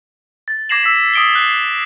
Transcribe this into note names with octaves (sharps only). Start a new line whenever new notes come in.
A6
D6 G#6 A#6 C7 E7 F#7
E6 B6
D#6 D7 G7
F#6 C7